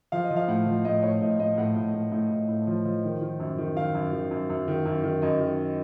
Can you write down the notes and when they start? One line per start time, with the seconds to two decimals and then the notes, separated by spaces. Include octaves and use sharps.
0.12 F3 F5
0.24 D#5
0.31 F3
0.36 F5
0.48 A2 F#5
0.67 F3
0.85 A2 D#5
1.03 A2 C#5
1.21 A2 D#5
1.40 A2 D#5
1.58 A2 F#5
1.76 A2
1.94 A2
2.12 A2
2.30 A2
2.49 A2
2.67 F3
2.85 F3
3.04 D#3
3.22 D#3
3.40 F#2
3.58 D#3
3.76 D#3 F5
3.95 F#2
4.13 D#3
4.31 F#2
4.50 F#2
4.68 D#3
4.86 F#2
5.03 D#3
5.22 F#2 D#5
5.40 D#3